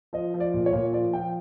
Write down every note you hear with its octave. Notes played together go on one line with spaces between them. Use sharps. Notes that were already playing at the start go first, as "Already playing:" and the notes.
F3 D#5
F3
D5
A#2
C#5
A#2
F3 D5
F3 G5